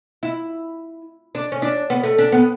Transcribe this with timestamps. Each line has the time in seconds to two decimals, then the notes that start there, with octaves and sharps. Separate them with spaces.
0.23 E4
1.35 D4
1.52 C#4
1.62 D4
1.90 B3
2.04 A3
2.19 D4
2.32 B3